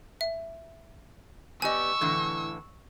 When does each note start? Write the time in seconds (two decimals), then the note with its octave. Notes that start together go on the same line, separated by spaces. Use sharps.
0.21 E5
1.62 B3 G4 D5 D#5 G#5 C#6 E6
2.01 A2 D3 E3